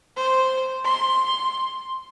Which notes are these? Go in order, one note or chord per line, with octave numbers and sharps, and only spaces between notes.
C5
C6